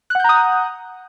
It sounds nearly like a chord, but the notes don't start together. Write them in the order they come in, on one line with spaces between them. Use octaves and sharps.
F#6 F#5 G6 A#5 D#6